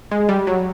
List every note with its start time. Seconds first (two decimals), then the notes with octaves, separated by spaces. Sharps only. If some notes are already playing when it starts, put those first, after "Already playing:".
0.11 G#3
0.29 G3
0.47 F#3